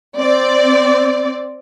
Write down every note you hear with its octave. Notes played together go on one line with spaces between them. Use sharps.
C4 D5